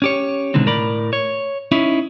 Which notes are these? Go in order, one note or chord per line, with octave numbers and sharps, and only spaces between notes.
C#4 G4 C#5
B2 D3 D#3 G#3 C4
A2 A#4 D5 B5
C#5
C#4 D#4 E4